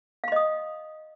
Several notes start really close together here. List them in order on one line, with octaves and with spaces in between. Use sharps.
F5 C6 D#5 D#6